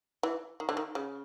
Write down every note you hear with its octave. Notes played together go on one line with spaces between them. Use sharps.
E3
D#3
D3
D#3
C#3